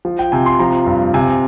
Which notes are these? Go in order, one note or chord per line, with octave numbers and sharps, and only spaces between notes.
F3
G5
C3 G#5
C6
F3 A#5
G2
C3 G#5